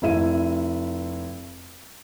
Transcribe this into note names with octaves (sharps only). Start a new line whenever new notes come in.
F1 E4 D#7